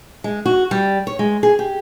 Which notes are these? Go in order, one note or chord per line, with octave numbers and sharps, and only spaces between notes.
G#3
F#4
G3
C#5
G#3
G#4
G4